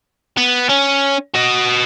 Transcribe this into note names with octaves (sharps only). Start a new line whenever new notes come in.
B3
C#4
F#4 D#5